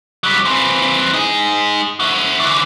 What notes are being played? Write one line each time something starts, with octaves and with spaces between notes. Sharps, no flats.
F#3 G3
E3 C4
D#4 G#4
E4 F#4
D3 E3